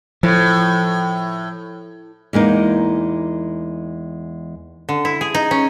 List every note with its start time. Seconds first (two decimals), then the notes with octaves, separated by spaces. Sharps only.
0.23 A2 F3
2.33 E2 G#3 A#3 D#4
4.89 D3
5.05 E4
5.21 G#4
5.34 D#4
5.51 C#4